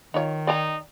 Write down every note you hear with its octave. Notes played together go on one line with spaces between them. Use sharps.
D#3 D#4 F4 C#5
D#4 D5 G5 A#5